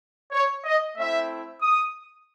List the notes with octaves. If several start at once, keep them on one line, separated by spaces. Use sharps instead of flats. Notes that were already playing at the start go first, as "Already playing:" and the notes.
C#5
D#5
A3 C4 E4 E5
D#6